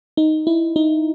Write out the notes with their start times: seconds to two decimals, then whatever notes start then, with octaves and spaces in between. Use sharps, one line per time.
0.17 D#4
0.47 E4
0.76 D#4